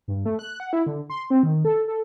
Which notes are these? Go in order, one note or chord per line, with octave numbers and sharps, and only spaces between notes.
G2
A3
F#6
F#5
E4
D3
C6
C4
D#3
A4
A4